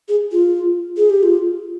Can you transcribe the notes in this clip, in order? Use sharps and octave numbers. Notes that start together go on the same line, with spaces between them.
G#4
F4
G#4
G4
F4